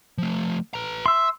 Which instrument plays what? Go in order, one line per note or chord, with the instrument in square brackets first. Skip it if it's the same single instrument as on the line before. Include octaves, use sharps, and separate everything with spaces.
[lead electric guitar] F3 A3
B4 A#5
[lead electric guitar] E5 [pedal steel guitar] C6 E6